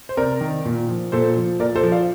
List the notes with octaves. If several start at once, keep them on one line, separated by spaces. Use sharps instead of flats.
C5
C3 A#4 D5
D#3
A#2
F3
A#2 A4 C5
F3
A#2 A#4 D5
A4 C5
F3
D5 F5